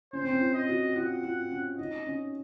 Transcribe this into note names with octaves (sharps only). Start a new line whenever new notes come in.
C#4 C5
C4
C#4
F4
D#5
F#4
F4 F#5
F4
C#4
D#4 D#5
C#4